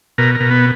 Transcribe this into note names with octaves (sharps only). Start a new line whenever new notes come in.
B2 A#4
A#4
B2
B3